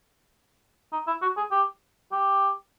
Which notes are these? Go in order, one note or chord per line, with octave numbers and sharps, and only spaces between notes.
D#4
E4
F#4
G#4
G4
G4